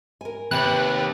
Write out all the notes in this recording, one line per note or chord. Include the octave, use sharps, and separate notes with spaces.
A#4 G#5
D#2 C3 B4 F#6